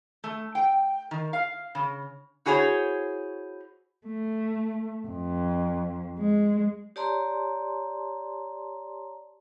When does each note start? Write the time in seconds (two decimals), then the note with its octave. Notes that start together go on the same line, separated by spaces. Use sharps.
0.24 A3
0.55 G5
1.11 D#3
1.33 F5
1.75 C#3
2.46 E4 F#4 G#4 C5 C#5
4.07 A3
5.08 F2
6.19 G#3
6.96 G4 C#5 D5 A5 A#5 C6